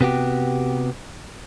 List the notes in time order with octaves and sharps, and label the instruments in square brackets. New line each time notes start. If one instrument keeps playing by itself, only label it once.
[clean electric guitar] C3 B3 F#4 G4